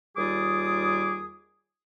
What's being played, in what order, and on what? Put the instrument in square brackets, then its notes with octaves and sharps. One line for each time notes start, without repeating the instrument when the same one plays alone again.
[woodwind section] D#2 G3 F4 G#4 D6 D#6